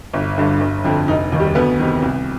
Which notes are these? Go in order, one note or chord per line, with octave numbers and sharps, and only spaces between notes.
G1
G2 D3
G1
F2 D3
F1 D#4
D#2 D#3
G3 G4
D2 B3 B4
C3 D#3
C2